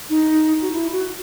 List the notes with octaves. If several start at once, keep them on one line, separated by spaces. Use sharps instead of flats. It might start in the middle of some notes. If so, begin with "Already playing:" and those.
D#4
F#4
E4
F#4